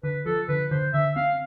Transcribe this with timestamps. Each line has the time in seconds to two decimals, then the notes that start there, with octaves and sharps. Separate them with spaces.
0.03 D3 B4
0.25 F3 A4
0.49 D3 B4
0.71 D3 C5
0.94 D3 E5
1.16 C4 F5